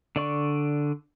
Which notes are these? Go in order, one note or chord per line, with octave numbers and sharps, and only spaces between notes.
D3 D5 C#6